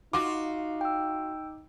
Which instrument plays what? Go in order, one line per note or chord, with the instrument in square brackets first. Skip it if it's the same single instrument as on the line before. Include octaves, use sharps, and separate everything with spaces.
[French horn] D#4 [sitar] F4 F#4 [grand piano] D6
[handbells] G5 E6